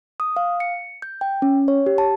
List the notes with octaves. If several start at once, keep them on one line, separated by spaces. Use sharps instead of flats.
D#6
F5
C#7
G6
G5
C#4
C#5
G4
A5